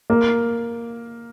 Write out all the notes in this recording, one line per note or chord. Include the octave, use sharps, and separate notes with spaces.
A#3